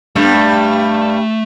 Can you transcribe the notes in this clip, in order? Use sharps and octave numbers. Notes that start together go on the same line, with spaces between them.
G2 G3 A3
B3
A3